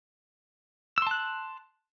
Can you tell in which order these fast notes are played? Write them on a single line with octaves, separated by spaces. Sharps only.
E6 C6 A5 F#6